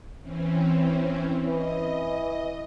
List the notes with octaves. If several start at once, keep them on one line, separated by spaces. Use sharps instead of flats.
E3 C4 C#4
E3 D#5